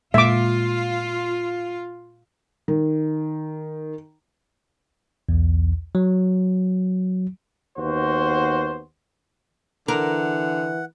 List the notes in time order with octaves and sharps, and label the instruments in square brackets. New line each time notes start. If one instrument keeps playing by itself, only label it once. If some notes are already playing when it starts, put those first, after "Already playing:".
[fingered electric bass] A#2 G#3 A#3 [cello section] F4 [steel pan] E5 D6
[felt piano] D#3
[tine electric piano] B1 E2
F#3
[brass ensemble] D#2 B3 F#4 C5
[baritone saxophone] D3 [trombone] E3 [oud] A#4 [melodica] F#5